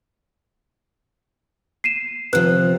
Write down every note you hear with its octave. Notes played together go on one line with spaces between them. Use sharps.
C7 D#7 E7
C3 F3 B4 F#6